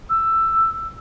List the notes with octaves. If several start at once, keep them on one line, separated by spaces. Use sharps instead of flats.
E6